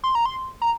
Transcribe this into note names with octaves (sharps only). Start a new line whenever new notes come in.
C6
A#5
C6
A#5